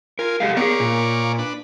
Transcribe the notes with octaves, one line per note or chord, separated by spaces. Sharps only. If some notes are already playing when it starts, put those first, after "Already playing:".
F4 A#4 G#5
G#3 G4 A4 F5
A#3 B3 G#4 C#5 D5
A#2
D4 B4